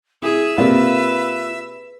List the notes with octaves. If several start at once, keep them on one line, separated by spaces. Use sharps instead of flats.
E4 G#4 E5
C3 A#3 C4 F4 B4 D5